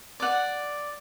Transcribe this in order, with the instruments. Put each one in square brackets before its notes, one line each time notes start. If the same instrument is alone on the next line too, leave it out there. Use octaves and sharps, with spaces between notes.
[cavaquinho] D5 F#5